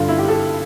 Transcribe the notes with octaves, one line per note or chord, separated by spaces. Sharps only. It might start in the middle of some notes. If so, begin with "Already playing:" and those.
Already playing: G2 D3 F4
E4
G4
A4